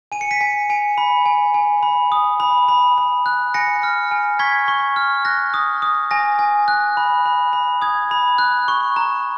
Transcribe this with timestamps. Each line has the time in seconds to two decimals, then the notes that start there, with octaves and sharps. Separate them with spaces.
0.12 G#5 D#7
0.21 C#7
0.31 B6 D#7
0.41 G#5
0.70 G#5
0.98 B5
1.26 G#5
1.54 G#5
1.83 B5
2.12 D#6
2.40 B5
2.68 B5
2.98 B5
3.26 F#6
3.54 G#5 A#6 C#7
3.83 F6
4.11 G#5
4.39 C#6 G#6 B6
4.68 C#6
4.96 F6
5.25 F#6 A#6
5.54 D#6
5.82 D#6
6.11 G#5 A#6
6.39 G#5
6.68 F#6
6.97 B5
7.26 B5
7.53 B5
7.82 D#6 G#6
8.11 B5
8.38 F#6
8.68 C#6
8.96 A#5